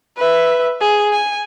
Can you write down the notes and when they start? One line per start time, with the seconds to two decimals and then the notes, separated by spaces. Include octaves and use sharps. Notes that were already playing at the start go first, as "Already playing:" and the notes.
0.17 B4 E5
0.81 G#4
1.12 G#5